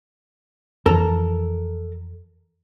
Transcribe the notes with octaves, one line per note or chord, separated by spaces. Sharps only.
F2 E3 A4 A#4 A#5